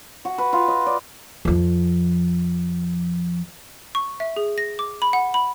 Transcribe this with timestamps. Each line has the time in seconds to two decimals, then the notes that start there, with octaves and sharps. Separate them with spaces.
0.25 F#4
0.38 B4
0.53 F4
0.68 D#5
0.87 D5
1.45 F2 F3
3.95 C#6
4.20 E5
4.36 G#4
4.58 A#6
4.79 D6
5.02 B5
5.13 F#5
5.34 B5